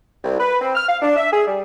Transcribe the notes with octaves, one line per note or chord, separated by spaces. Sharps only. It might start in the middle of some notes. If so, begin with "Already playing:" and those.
C2
B4
C4
F6
F5
D4
E5
G#4
G3